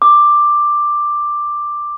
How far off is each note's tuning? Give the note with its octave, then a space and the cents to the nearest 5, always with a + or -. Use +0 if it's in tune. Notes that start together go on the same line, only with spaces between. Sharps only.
D6 +10